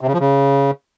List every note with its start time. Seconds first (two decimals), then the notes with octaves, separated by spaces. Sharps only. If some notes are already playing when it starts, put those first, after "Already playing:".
0.01 C3
0.07 C#3
0.14 F3
0.20 C#3